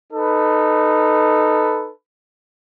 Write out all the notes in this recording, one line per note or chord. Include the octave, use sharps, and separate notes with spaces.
D#4 A4 B4